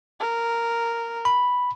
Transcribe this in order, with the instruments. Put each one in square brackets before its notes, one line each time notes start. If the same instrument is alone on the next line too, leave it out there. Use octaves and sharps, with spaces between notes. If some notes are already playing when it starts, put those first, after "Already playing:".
[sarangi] A#4
[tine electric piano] B5